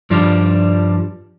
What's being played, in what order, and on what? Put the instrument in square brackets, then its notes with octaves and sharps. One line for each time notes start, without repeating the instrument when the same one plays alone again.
[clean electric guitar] G2 F3 G3 D4